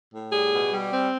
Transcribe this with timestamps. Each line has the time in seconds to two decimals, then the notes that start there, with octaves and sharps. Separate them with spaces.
0.14 A2
0.32 G3 G#4
0.52 B2
0.72 G3
0.92 C4